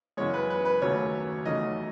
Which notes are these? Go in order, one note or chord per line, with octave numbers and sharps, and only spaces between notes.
F#2 C#3 E3 G#3 C#5
B4
B4
B4
D#2 C#3 F#3 A3 C#5
E2 C#3 F#3 A3 D#4 D#5